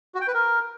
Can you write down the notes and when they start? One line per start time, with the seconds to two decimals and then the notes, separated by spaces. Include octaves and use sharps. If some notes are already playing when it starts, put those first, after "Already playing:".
0.15 F#4
0.21 G5
0.28 B4
0.34 A#4